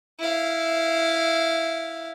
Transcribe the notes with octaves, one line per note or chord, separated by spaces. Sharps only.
E4 F5